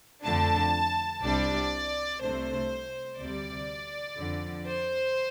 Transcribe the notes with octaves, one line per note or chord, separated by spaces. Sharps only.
F2 D3 A3 D4 A5
C2 C3 G3 D4 D5
C2 C3 A3 D4 C5
D2 C3 G3 D5
F2 D3 F3
C5